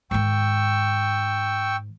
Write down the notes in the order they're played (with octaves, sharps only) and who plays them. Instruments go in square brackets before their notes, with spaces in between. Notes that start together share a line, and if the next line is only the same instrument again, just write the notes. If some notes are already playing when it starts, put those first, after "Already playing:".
[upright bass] G#2 D#3 [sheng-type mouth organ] G5 C#6 E6